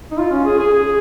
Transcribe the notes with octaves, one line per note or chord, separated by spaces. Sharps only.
D#4
F4
C#4
G#4
G#4
G#4